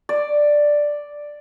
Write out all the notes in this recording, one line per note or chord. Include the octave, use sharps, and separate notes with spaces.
D5